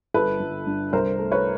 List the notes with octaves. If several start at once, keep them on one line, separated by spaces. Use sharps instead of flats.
G1 A4 B4
G1
G2
C2 A#4 C5
A3
B4 C#5